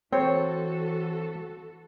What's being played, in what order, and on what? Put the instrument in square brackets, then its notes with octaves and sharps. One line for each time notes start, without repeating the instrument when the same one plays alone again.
[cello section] E3 F#4 A4 [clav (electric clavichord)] C4 [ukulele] C#5